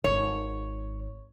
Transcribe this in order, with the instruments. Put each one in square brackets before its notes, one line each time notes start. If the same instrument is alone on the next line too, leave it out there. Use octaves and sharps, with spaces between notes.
[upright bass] G#1 [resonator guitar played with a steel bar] C#5